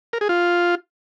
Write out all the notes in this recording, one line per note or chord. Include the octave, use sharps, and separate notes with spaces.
A#4
G#4
F4